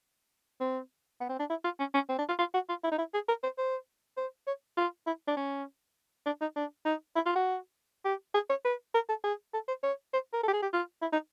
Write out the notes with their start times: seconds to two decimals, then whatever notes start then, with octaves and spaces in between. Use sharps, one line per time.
0.60 C4
1.20 B3
1.29 C4
1.39 D4
1.50 E4
1.64 F4
1.79 C#4
1.94 C#4
2.09 C4
2.19 D4
2.29 F4
2.39 F4
2.54 F#4
2.69 F4
2.84 E4
2.91 D#4
2.98 E4
3.14 G#4
3.28 A#4
3.43 C5
3.58 C5
4.17 C5
4.47 C#5
4.77 F4
5.07 E4
5.27 D4
5.37 C#4
6.26 D4
6.41 D#4
6.56 D4
6.85 D#4
7.16 E4
7.26 F4
7.36 F#4
8.05 G4
8.34 G#4
8.50 C#5
8.65 B4
8.94 A#4
9.09 A4
9.24 G#4
9.54 A4
9.68 C5
9.83 C#5
10.13 C5
10.33 A#4
10.43 A4
10.48 G4
10.53 G#4
10.62 G4
10.73 F4
11.02 E4
11.12 D#4